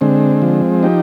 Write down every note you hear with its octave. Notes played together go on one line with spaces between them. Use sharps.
D3 G#3 C4
F3
D#4 G4